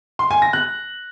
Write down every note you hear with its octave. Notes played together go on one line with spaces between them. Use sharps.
C6
G#5
A#6
F#6